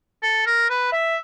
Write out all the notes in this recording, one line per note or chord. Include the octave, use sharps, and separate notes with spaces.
A4
A#4
B4
E5